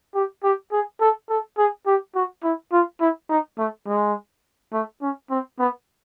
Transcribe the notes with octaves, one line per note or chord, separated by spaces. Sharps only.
G4
G4
G#4
A4
A4
G#4
G4
F#4
E4
F4
E4
D#4
A3
G#3
A3
C#4
C4
B3